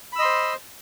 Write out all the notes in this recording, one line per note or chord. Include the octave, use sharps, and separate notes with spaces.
C5 D#5 B5 C6 E6